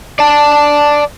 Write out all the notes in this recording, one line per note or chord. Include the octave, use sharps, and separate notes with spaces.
D5 A5